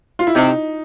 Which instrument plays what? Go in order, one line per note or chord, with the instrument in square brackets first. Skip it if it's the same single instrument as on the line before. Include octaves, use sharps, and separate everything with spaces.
[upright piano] F4
E4
[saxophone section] C3 [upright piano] D#4